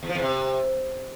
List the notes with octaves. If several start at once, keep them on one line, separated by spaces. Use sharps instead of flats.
E2
F3
E2
C3